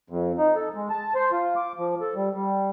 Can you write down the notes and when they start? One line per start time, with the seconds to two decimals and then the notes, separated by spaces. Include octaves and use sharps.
0.10 F2
0.38 D#4
0.56 A4
0.75 G#3
0.90 A5
1.15 C5
1.32 F4
1.56 D6
1.79 F3
2.01 A4
2.16 G3
2.35 G3